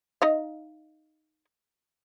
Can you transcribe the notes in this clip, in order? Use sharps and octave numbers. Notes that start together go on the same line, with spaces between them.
D#4 D#5 F5